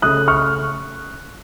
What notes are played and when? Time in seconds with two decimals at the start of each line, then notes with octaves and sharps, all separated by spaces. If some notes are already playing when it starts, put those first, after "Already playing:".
0.02 C#3 A3 C#4 D#6 F#6
0.28 C#6 F6